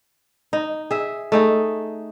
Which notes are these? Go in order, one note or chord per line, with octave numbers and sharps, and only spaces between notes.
D#4
G#4 E5
A3 D#4 G#4